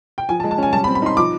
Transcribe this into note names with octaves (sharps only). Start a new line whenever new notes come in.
G5
F3 G#5
A5
G#3
A5
C#4 G#5
G3 A5
B5
C4
B5
D#4 C6
F3 D6